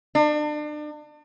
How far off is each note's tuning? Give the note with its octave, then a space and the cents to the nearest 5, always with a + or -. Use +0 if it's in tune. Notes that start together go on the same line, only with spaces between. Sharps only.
D4 +35